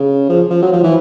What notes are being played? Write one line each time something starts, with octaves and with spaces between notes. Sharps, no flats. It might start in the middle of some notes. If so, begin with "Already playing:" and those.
Already playing: C#3
F3
F3
F#3
F3
E3